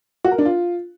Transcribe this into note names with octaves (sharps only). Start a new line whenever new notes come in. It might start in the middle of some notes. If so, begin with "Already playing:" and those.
F#4
A#4
D4
F4